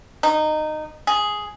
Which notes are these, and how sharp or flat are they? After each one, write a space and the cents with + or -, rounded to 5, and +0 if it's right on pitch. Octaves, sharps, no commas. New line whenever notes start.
D#4 -15
G#4 +5